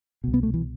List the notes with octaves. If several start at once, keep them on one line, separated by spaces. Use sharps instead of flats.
C2 B2
B3
A3
E3